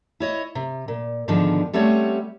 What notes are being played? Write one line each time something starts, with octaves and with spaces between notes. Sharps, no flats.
E4 C#5 D#5
C3
A#2
G#2 D3 D#3 F3 B3 D4
G3 A3 C4 C#4 C#5 F#5